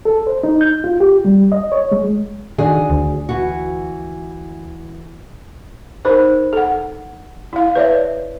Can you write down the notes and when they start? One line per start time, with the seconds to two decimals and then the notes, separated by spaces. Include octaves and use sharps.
0.05 A4
0.27 C5
0.43 D#4
0.61 G6
0.84 F4
1.00 G4
1.25 G3
1.52 D#5
1.72 C#5
1.92 G#3
2.58 D#3 D4 F#4 G#4
2.90 D2
3.29 E3 F#4
6.05 D#4 A#4 C5
6.53 A4 F#5
7.53 E4 F5
7.76 B4 C#5 D5 E5